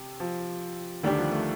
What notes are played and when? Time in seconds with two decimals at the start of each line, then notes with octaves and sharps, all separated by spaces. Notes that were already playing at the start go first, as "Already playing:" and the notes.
Already playing: C3
0.20 F3
1.03 D2 D3 D#3 G3 D4 G4
1.17 F3
1.32 A3